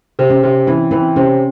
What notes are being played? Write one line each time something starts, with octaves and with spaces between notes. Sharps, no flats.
C3
C#4
C3
E3 C4
E3 C4
C3 C#4